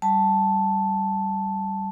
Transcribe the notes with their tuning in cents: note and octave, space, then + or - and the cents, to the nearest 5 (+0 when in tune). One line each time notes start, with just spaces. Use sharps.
G3 -15 A5 +0